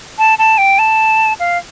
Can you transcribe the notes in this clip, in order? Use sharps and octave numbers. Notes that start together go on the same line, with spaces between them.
A5
A5
G5
A5
F5